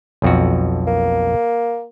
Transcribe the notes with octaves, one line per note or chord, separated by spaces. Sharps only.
B1 F2 F#4
A#3